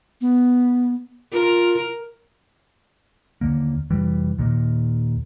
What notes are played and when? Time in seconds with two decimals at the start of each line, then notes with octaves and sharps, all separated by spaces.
0.21 B3
1.33 F4 A#4
3.41 D#2 D3 A#3
3.90 F1 E3 G3
4.38 D#2 A#2 D#3